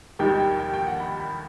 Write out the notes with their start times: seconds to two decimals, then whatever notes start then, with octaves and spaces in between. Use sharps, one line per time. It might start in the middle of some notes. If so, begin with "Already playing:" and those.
0.19 D#2 D#3 G3 D#4 G4 G5
0.40 G5
0.59 G5
0.73 G5
0.87 F#5
1.00 B5
1.20 B5